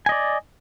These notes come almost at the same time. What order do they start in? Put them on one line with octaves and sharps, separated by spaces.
G#5 D#5 D5